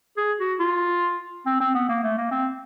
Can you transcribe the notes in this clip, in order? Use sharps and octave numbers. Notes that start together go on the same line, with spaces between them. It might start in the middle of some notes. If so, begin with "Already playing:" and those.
G#4
F#4
F4
C4
C4
B3
A#3
A3
A#3
C4